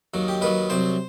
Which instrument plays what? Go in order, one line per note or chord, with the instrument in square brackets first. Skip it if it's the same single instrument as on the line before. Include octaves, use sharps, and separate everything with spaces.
[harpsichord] D#2 D#3 F#3
G4
D#2 D#3 F#3 B4
C2 C3 F#3 C5